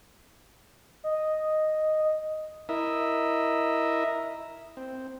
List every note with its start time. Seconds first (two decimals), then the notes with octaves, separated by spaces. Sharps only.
1.04 D#5
2.69 E4 A#4 D#5 E5
4.77 C4